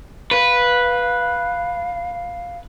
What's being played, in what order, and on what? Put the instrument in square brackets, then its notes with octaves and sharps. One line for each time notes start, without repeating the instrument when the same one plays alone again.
[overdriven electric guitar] B4 [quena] F5